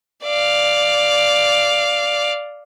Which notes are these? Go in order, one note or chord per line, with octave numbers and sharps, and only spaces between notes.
D5 F5